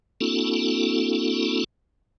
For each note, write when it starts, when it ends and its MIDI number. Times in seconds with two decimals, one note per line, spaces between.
0.21 1.64 58
0.21 1.64 60
0.21 1.64 62
0.21 1.64 64
0.21 1.64 66
0.21 1.64 69